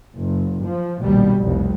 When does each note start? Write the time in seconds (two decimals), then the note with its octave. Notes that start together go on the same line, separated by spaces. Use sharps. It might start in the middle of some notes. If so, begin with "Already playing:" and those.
0.18 F#1
0.65 F3
1.01 A#1 D#2 B2 G3
1.39 F1 C2